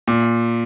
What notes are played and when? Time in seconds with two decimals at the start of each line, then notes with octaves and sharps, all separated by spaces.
0.08 A#2